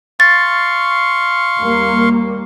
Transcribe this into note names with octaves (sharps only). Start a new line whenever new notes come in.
F5 C6 C#6 A6
D#2 G3 A#3